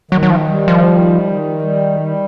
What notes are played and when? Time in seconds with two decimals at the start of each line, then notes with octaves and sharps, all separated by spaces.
0.11 D#3 F#3
0.23 F#3
0.30 F3
0.49 G3
0.68 F3
0.86 D#3
1.24 D#3
1.62 G3
1.99 G3